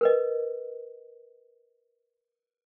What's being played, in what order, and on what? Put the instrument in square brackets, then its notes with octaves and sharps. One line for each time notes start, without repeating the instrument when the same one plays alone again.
[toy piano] A#4 B4 D#5